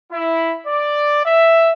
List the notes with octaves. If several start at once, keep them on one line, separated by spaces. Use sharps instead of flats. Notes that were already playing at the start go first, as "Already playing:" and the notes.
E4
D5
E5